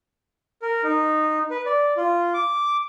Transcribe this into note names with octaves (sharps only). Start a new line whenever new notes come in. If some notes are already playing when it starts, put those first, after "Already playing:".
A#4
D#4
B4
D5
F4
D6